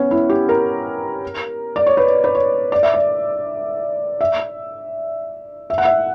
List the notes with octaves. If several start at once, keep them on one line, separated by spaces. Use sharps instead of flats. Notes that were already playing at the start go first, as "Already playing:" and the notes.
Already playing: B3 C#4
E4
G4
A#4
D5
C#5
B4
B4
C#5
D5
E5
D5
E5
E5
F#5
E5